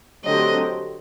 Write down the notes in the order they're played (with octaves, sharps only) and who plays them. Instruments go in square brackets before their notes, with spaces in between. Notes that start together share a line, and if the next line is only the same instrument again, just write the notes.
[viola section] D3 F#3 A3 C4 G4 [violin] D#5